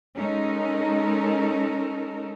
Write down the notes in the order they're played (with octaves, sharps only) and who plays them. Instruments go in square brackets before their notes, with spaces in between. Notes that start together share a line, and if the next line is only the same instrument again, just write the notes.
[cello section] G#3 C#4 D#4 A4 A#4